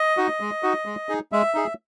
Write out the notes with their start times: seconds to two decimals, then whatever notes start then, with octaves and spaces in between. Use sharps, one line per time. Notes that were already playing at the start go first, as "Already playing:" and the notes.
Already playing: D#5
0.17 D#4 F#4
0.40 G#3
0.63 D#4 F#4
0.85 G#3
1.09 D#4 G#4
1.32 G#3 E5
1.54 D#4 G#4